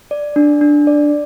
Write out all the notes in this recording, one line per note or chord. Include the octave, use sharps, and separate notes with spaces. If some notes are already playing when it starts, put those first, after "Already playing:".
D5
D4
D4
D5